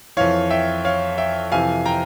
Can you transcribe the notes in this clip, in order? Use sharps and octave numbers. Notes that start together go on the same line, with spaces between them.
F2 E3 C#5 F5
E5 G5
C#5 F5
E5 G5
F2 C3 E3 F5 G#5
G5 A#5